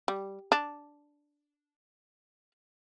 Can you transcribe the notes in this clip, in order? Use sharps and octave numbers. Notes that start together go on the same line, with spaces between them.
G3
D4